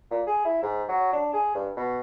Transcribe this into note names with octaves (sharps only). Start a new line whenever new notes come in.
A#2
G#4
E4
G#2
F#3
D4
G#4
G2
B2